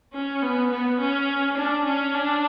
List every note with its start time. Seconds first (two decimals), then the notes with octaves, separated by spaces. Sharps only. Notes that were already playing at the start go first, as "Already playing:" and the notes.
0.13 C#4
0.42 B3
0.71 B3
0.99 C#4
1.57 D4
1.85 C#4
2.14 D4